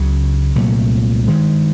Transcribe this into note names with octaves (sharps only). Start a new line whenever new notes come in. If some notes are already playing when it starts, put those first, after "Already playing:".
Already playing: C#2 C#3 F#3
C2 A#2 F#3 A3
G2 D#3 G#3